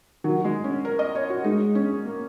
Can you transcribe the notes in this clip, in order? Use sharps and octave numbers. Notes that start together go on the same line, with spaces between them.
D#3 F#3
G#3
C#4
A#4
D#5
C#5
F#4
G#3 D#4
C#4
A#3